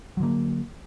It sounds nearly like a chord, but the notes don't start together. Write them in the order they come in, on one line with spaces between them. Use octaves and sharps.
F#3 D3 A#3